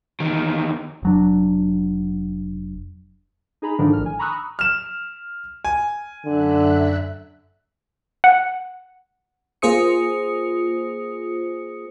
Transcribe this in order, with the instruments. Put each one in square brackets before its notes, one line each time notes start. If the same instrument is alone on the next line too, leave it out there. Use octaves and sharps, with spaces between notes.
[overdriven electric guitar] E2 D#3
[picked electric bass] F1 F#3 D4
[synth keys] D#4 G#4 A#5 B5
G#2 D3 D#3 F3 D4
A1 F6
G#5
A#5 B5 C#6 D#6 E6 F#6
[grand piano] F6 E7
G#5
[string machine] F#2 E5 F#6 [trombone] D3
[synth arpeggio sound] F#5
[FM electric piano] A#3 F4 G#4 C5 D#6 C#7